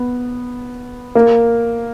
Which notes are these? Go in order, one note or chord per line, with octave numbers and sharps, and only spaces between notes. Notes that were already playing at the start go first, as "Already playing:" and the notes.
Already playing: B3
A#3